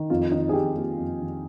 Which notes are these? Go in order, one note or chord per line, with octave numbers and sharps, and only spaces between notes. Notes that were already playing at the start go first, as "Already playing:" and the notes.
Already playing: D#3
F2 F4
D#3 D#4
G#4
F2 G4
A#3 G4
F2
D#3